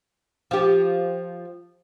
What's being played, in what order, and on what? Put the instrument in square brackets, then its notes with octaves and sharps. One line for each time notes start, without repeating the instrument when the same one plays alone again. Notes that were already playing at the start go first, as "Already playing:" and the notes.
[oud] F3 G4